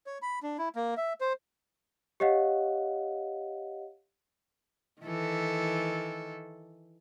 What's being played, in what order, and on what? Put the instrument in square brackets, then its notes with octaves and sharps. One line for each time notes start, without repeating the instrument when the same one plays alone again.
[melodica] C#5
B5
D4
E4
A#3
E5
C5
[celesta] G4 C#5 D#5 F5 F#5
[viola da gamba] D#3 E3 A4